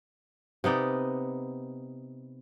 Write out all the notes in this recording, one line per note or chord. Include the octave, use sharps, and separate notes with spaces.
C3 B3 D#4 D5